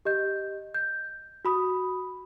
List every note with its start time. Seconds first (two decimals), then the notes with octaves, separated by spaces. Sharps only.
0.05 G4 D#5 G6
0.74 G6
1.45 F#4 B5 D#6